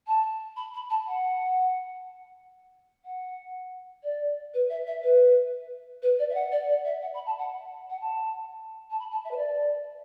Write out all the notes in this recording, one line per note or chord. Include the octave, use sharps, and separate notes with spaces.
A5
B5
B5
A5
F#5
F#5
D5
B4
E5
E5
B4
B4
D5
E5
F#5
D5
D5
E5
F#5
B5
A5
F#5
F#5
A5
A5
B5
A5
E5
B4
D5